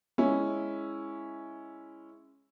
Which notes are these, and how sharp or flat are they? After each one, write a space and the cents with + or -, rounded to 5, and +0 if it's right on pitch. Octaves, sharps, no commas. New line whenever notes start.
G#3 +0 C#4 +0 E4 +0